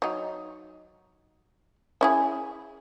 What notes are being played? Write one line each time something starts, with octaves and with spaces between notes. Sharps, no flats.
F#3 D#4
C#4 E4 G#4